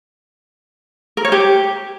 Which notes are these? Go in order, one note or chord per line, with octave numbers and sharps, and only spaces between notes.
A#4
C#5
G4